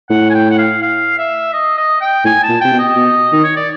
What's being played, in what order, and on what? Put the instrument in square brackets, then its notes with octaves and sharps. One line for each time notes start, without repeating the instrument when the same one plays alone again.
[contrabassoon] A2 [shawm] F#5
[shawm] G#5
G5
F#5
F5
F5
E5
D#5
D#5
G5
[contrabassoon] A2 [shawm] G#5
[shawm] A5
[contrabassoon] A#2
[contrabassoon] C3 [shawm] G5
[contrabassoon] B2
[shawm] D#5
[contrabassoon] B2
D#3
[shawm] C#5
D5